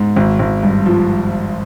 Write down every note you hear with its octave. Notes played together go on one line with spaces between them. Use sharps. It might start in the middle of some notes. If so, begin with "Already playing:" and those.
Already playing: G#2
G#1
G#1
G2
F3